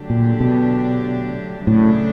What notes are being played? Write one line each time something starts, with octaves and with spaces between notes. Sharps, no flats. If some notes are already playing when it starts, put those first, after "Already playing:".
Already playing: D3 F#3 A3 D4 G4
A#2
B2
D2 A2 C#3 F#3 A3 D4